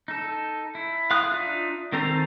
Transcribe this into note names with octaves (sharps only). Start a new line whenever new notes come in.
D#4 A4
E4
F5 C6 D#6 F#6
D4 D#4 F4 E5
D#3 C4 A4 C5 A#5